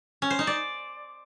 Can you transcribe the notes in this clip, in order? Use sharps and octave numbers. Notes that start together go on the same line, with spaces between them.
C#4
C5
D#4
D5